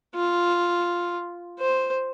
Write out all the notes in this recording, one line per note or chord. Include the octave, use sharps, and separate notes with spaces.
F4
C5